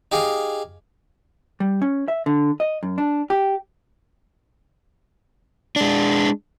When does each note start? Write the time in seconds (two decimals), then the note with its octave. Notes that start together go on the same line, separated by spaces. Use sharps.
0.12 D#4 G4 G#4 F5
1.60 G3
1.82 C#4
2.08 E5
2.26 D3
2.60 D#5
2.83 F#2
2.98 D4
3.30 G4
5.76 G#3 D4